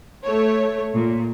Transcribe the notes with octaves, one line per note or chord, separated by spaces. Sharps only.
A3 C#5
A#2